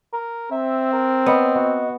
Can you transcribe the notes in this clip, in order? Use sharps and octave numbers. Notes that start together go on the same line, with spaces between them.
A#4
C4 E5
A#4
B3 C#5 D#5 B5
F#4 D#5